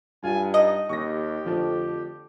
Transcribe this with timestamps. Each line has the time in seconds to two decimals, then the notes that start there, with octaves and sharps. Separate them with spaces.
0.24 G2 F4 G#5
0.54 D#4 D#5
0.89 D#2 G4 C#6 A#6
1.46 F2 D3 F3 A3